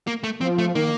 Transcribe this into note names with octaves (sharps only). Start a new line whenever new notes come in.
A#3
A3
F3 C4
A3
D#3 A#3